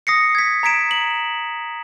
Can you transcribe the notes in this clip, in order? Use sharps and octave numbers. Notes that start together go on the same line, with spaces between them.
D#6 A#6 C7 C#7
G#6 B6
A#5 G#6 B6 D7 E7
F#7